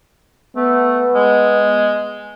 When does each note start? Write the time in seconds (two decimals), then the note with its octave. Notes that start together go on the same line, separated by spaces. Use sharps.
0.56 A3 B3
1.15 G#3